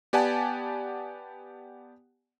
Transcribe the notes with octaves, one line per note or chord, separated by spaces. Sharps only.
B3 G4 D5 F#5 G#5 A5